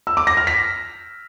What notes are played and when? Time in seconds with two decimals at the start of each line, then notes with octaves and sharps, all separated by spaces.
0.07 E6
0.17 D6
0.27 A#6
0.37 F6
0.47 B6